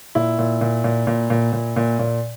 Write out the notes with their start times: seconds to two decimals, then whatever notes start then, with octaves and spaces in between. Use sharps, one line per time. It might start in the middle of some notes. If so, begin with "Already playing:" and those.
0.15 A#2 E4
0.39 A#2
0.61 A#2
0.84 A#2
1.07 A#2
1.30 A#2
1.53 A#2
1.76 A#2
1.99 A#2